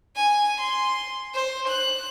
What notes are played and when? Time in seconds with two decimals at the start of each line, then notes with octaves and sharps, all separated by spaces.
0.16 G#5
0.60 C6
1.34 C5
1.68 F#6